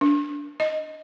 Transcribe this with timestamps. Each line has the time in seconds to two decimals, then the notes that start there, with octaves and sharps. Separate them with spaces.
0.01 D4
0.60 D#5